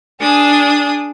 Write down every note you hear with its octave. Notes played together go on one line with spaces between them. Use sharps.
D4 G#4 D#6